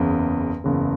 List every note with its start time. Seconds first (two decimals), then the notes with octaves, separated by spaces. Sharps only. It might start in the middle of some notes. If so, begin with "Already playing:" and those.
Already playing: F#1 E2 C#3
0.64 F#1 E2 C#3